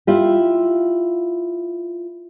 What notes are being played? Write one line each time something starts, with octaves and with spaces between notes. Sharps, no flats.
E4 F4 G4